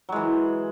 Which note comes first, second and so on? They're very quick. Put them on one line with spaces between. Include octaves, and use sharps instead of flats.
F#3 G#3 E3